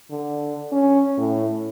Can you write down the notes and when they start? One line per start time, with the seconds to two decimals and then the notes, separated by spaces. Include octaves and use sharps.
0.11 D3
0.72 C#4
1.17 A2